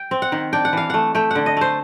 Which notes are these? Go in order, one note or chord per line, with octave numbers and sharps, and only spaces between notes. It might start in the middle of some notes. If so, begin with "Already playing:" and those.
Already playing: G5
C4
F#5
D#3
D4 G5
F#5
E3 F5
A3 F#5
A3 G5
D3 F#5
D#5
A3 C5